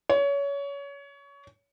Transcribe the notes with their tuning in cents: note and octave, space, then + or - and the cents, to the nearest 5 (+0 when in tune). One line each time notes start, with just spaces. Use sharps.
C#5 +25